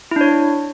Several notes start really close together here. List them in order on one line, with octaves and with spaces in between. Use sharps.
E4 D4 C#5